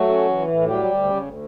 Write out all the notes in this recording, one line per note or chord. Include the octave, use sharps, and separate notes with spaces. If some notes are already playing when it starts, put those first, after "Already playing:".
Already playing: F#3 A3 F#4
C#4
E3
A2
F#3 G3 G4
D2
C#3
D2